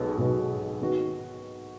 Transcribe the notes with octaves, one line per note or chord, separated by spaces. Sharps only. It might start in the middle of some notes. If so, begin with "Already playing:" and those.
Already playing: B1 B2 G#3 B3
B1 B2 G#3 B3 F#4
D#3 B3 F#4